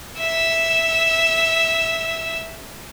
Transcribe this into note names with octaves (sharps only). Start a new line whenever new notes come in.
E5 E6